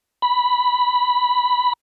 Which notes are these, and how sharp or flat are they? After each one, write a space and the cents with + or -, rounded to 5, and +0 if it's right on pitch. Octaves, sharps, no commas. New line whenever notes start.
B5 +0